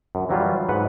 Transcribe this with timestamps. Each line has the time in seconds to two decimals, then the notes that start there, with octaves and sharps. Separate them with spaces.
0.15 F#2
0.29 E3 F#3 G3 F4
0.69 G#2 B4 F#5